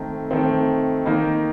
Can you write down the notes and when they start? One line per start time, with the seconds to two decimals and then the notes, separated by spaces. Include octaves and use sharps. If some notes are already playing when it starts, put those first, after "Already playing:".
Already playing: D#3 A3 C4
0.31 D#3 A3 C4
1.06 D#3 A#3 D#4